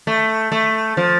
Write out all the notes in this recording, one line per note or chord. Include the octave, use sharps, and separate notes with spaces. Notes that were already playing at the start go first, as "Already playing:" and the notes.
A3
A3
F3